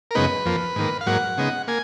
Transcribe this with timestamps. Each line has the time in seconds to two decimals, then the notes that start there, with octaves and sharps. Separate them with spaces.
0.11 A#4
0.15 F#2 C#3 G#3 B3 D#4 B4
0.45 F2 F3 A#3
0.76 G#2 D#3 A#3
1.01 F5
1.07 G#2 F#3 A#3 F#5
1.38 C#3 G#3 B3 D#4
1.68 A#3 G#5